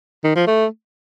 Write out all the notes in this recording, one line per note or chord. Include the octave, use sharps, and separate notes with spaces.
D#3
F3
A3